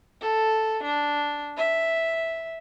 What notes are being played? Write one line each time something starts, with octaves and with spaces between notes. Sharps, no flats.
A4
D4
E5